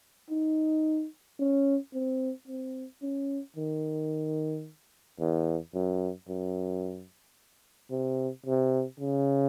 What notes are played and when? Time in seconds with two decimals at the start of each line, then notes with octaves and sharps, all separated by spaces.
0.30 D#4
1.39 C#4
1.94 C4
2.48 C4
3.02 C#4
3.56 D#3
5.20 E2
5.74 F#2
6.29 F#2
7.91 C3
8.46 C3
9.00 C#3